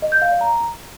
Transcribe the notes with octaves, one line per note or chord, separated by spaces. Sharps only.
D#5
G6
F5
D5
A#5